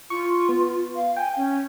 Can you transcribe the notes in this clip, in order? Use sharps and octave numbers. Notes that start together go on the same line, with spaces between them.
F4 C#6
B3
F5
G5 G#5
C#4